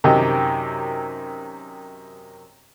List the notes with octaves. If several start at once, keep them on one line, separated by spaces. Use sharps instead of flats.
F#2 C3 D#3 G4 D#5 G5